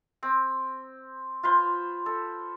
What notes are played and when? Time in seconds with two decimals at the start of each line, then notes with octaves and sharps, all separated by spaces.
0.23 C4
1.43 F4 B4 C5 C6
2.06 A4